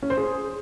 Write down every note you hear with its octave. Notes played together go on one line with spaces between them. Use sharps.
C#4
C5
G#4